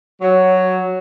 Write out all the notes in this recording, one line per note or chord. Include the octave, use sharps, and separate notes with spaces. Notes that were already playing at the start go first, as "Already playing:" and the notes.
F#3